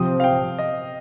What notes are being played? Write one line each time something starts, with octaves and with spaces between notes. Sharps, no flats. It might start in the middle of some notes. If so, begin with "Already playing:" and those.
Already playing: C3 F3 C4 D#6
F5
G5
D#5